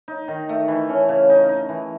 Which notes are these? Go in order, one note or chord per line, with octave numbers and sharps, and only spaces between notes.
D#4
D#3
A3
E3
C#4
C#3
D#4
D#4
E3